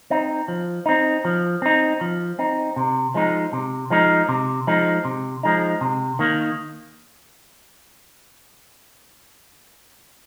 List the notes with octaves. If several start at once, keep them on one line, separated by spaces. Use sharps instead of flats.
C4 D#4
F3
C4 D#4
F3
C4 D#4
F3
C4 D#4
C3
F3 G#3 D#4
C3
F3 G#3 D#4
C3
F3 G#3 D#4
C3
F3 G#3 D#4
C3
D#3 A#3